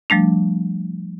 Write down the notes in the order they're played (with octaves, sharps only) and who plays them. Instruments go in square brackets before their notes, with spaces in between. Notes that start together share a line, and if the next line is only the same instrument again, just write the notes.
[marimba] F3 G3 A3 D4